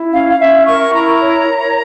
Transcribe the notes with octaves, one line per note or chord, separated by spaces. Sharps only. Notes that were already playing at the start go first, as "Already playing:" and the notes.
Already playing: E4
C#4 F5
F5
C#4 E5
A#4 C#6
G#5
E4 A#5
C#5
A#4